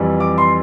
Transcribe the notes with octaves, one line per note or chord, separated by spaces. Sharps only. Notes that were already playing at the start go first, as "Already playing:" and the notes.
Already playing: F2 E3 G3
D6
C6